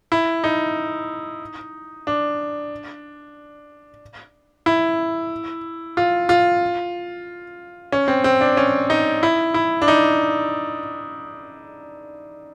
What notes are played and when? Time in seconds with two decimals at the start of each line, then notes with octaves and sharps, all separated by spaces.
0.12 E4
0.44 D#4
2.07 D4
4.66 E4
5.97 F4
6.29 F4
7.92 C#4
8.08 C4
8.24 C4
8.41 D4
8.57 C#4
8.90 D#4
9.23 E4
9.54 E4
9.82 D4
9.88 D#4